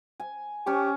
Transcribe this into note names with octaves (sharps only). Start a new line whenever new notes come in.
G#5
C#4 G4 C#6